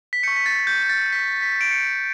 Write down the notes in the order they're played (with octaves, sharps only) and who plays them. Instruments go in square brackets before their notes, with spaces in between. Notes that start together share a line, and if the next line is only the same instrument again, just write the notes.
[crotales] B6
C#6 G6 C#7
B6
A6
G6
G6
A6
B6
B6
D7
C#7